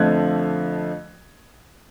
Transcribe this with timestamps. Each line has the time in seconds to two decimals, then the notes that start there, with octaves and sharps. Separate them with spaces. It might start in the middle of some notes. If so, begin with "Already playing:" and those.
Already playing: F2 D3 F3 A3 F#6 G#6